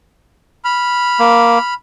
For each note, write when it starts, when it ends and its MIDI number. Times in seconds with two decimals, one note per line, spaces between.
0.65 1.74 83
0.65 1.74 89
1.19 1.59 58